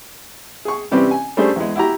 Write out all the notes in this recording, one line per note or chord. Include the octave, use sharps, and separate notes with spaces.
G#4 C#6
C3 E3 G3 C4 C#4 G4
G#5
G3 A3 C#4 D4 G#4 C5
E2 G#3
E4 F#4 G4 A#5